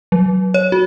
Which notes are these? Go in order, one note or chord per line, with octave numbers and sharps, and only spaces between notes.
F#3
C#5
F#4